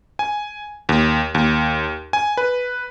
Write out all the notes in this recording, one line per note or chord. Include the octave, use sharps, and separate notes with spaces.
G#5
D#2
D#2
G#5
B4